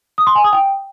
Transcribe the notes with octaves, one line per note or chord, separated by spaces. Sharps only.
D#6
C6
G#5
D#6
G5